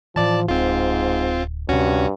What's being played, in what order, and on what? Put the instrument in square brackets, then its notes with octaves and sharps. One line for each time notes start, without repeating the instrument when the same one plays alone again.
[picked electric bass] A2 E3 [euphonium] F3 [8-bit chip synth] D5 A5
[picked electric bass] D1 [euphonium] G#2 [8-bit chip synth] C4 F4
[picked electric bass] D2 C3 [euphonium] G2 [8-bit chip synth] C#4 F#4